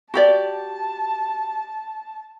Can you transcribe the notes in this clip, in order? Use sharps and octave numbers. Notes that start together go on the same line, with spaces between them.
F#4 G4 D5 A5